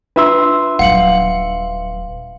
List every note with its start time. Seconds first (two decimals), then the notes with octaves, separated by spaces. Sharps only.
0.16 D4 F4 B4 E5 C6 E6
0.79 D#1 F#3 F5 F#5 C#7 F#7